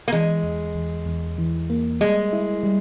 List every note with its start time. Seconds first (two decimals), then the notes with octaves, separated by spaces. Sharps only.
0.08 A#3
0.13 E3 G#3
0.43 E2
0.75 E2
1.06 E2
1.38 E3
1.70 A#3
2.01 G3 G#3
2.33 E4
2.63 G3